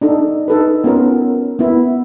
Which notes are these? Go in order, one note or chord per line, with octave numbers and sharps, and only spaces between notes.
D4 D#4 A4
D#4 A4 B4
B3 C#4 F4 A#4
B3 E4